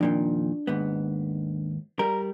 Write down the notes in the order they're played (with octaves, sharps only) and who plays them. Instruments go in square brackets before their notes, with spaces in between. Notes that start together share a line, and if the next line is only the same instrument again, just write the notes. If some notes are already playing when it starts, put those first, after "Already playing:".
[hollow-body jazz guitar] F2 A#2 D#3 [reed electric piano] D4
[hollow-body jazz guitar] D#2 G#2 B3
[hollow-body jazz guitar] G3 A#4 [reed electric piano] A#5